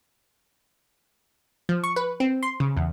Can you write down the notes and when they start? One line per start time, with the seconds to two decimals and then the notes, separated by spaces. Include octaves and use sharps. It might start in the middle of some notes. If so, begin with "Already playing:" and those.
1.69 F3
1.84 C#6
1.96 B4
2.20 C4
2.43 C6
2.60 C#3
2.77 E2